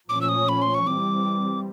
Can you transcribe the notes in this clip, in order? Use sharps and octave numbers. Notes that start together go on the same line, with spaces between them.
A#2 F3 A3 C#4 D6
E6
D#6
B5
C6
C#6
E3 G3 C4 D6